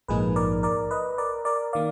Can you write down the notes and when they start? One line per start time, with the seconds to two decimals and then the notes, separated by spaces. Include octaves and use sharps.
0.08 A#1 G#2 F3 A#3 D#4 G#4 B4
0.36 A#4 D5
0.63 A#4 D5
0.91 B4 D#5
1.18 A#4 D5
1.45 A#4 D5
1.73 D#3 A#3 D5 F5